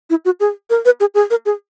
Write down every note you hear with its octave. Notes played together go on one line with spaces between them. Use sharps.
E4
F#4
G#4
A#4
B4
G#4
G#4
A#4
G#4